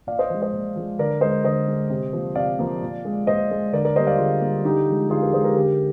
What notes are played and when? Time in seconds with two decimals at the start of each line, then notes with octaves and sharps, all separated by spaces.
0.07 A#2 D5 F5
0.19 C5 D#5
0.30 F3 G#3
0.42 C5 D#5
0.53 A#2
0.76 F3 G#3
0.98 D3 A#4 D5
1.21 G#3 C5 D#5
1.44 D3 C5 D#5
1.68 G#3
1.90 C3
2.13 F3 A#3
2.35 C3 D5 F5
2.59 F3 A#3
2.82 A#2
3.05 G#3
3.27 A#2 C5 D#5
3.51 G#3
3.73 D3 A#4 D5
3.85 A#4 D5
3.96 G3 A#3 C5 D#5
4.07 D5 F5
4.18 D3 F4 G#4
4.41 G3 A#3
4.64 D3 D#4 G4
4.88 F3 G#3
5.10 D3 F4 G#4
5.22 G4 A#4
5.33 F3 G#3 G#4 C5
5.44 G4 A#4
5.56 D3 G4 A#4